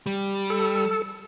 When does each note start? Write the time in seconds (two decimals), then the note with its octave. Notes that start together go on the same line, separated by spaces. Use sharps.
0.06 G3
0.50 A4